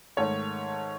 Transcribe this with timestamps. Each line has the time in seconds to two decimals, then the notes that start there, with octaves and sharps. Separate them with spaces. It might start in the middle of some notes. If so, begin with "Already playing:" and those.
0.17 G#2 D#3 A3 C#5